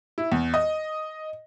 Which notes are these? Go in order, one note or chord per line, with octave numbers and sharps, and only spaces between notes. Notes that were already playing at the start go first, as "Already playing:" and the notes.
E4
E2
D#5